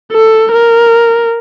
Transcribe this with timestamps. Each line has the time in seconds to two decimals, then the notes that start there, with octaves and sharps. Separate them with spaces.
0.13 A4
0.52 A#4